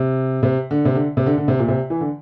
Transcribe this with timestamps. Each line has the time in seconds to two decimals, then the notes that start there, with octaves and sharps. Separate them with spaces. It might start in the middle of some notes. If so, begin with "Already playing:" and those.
Already playing: C3
0.43 C3
0.71 D3
0.85 C3
0.95 D3
1.17 C3
1.26 D3
1.38 D3
1.48 C3
1.59 A#2
1.68 C3
1.90 E3
2.01 D3